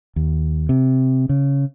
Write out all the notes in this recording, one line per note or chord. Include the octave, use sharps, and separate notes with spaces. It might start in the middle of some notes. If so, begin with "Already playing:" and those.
D#2
C3
C#3